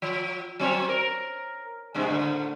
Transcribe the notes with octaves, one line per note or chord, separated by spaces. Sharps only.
F3
F#3 C4 C#5
A#4
G2 C3 G#3
A2 D3